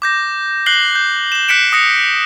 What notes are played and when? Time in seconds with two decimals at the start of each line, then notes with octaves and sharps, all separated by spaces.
0.02 D6 G6 A#6
0.66 F#6 A#6 C7 F#7 G7
0.95 G6
1.32 E7 G7
1.48 F#6 G6 B6 C#7 D7 E7
1.73 D#6 A#6 C#7